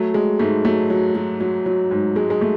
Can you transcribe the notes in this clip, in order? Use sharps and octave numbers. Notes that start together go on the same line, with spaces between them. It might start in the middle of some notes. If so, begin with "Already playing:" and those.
Already playing: F#3 A3
F#3 G#3
G#2 A3
F#3 A3
F#3
F#3
F#3
F#3
G#2
F#3 G#3
G#3
A3